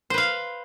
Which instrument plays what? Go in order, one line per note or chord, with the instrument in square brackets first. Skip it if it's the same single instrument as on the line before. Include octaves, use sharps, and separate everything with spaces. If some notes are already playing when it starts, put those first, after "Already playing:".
[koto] C5
B4
F5